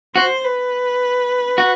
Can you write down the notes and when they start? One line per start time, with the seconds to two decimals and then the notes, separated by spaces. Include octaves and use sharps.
0.16 F#4 C5
0.44 B4
1.58 F#4